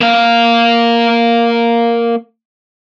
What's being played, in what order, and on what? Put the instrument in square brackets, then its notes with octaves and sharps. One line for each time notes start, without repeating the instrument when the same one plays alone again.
[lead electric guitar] A#3 F5